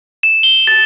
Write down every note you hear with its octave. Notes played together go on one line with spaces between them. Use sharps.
E7
G7
A6